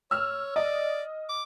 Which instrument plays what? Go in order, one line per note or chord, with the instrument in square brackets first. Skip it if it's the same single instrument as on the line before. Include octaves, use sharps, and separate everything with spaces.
[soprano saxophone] C#5 [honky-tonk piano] E6 F6
[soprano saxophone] D5 [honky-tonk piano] D#5
[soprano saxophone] D6